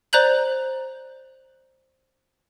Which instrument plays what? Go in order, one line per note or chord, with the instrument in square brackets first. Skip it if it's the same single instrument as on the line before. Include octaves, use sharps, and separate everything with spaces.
[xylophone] C5 D5 A#5 F#6 G6 F#7